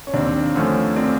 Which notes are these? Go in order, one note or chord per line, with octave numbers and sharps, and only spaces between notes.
C#4
D#2 C4 D4
D3 F3 A3 C#4
C4 D4